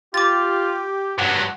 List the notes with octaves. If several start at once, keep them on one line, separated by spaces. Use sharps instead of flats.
F4 G4 D6 A6
G2 F#3 F#5